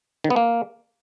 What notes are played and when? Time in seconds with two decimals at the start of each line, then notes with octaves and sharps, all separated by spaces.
0.24 D#3
0.30 B3
0.36 A#3